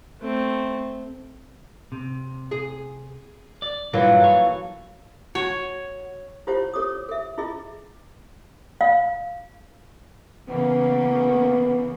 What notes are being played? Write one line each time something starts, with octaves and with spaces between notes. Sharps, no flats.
A3 C4
C3
G#4
D5
G2 A#2 E3 F#3 G3 A#3
A4 C#5
F#4 C#5
E4 F4 G4 C5 C#5 F#5
A4 C#5 D6 D#6
A4 E5
E4 F4 G#4 D#5
F5
C#3 E3 A#3 B3